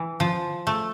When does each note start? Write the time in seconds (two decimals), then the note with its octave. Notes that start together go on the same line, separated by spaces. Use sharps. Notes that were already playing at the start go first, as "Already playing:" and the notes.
Already playing: E3
0.20 F3
0.67 A3